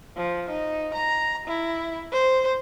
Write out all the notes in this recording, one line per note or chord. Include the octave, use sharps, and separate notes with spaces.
F3
D#4
A#5
E4
C5